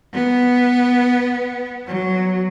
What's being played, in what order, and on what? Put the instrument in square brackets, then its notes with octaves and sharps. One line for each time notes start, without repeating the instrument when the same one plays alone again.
[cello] B3
F#3